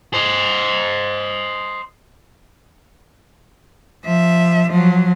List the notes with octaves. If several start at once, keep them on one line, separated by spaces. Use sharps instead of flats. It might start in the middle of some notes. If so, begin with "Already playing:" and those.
C5 D#5
F3 E5
F3 F#3